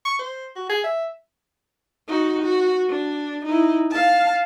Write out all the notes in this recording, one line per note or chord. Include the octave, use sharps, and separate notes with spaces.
C#6
C5
F#4
G#4
E5
D#4 F#4
F#4
D4
D#4 E4
F5 A5